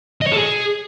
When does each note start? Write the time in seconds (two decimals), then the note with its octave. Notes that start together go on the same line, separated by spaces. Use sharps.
0.22 D#5
0.27 C#5
0.32 A4
0.38 G#4